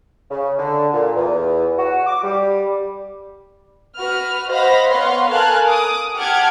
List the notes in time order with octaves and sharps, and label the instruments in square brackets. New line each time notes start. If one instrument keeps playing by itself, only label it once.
[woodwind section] C#3
D3
A#2
E2
F#4
D6
G3
[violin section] F#4 B4 F6
C5 D#5 F5 F#5 B5 A#6
B3 B4 C#5 F5 F#5 C6
A4 A#4 F5 G#5 A5 F#6
D6 D#6
G4 F#5 A5 D6 F6 G#6